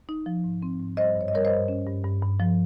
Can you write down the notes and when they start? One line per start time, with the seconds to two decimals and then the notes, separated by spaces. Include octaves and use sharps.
0.09 D#4
0.26 F3
0.44 G#2
0.62 C4
0.79 G#2
0.97 G3 C5 D#5
1.15 G2
1.21 C#5
1.28 D#5
1.33 G3 A#4 C#5
1.45 C5 D#5
1.51 G2
1.68 C#4
1.87 G2
2.04 G2
2.22 G2
2.40 F3